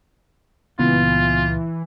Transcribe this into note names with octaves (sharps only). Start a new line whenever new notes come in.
C#2 A#2 E3 B3 F4